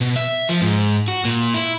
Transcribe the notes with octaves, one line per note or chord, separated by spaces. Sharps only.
B2
E5
F3
G#2
F#4
A#2
E4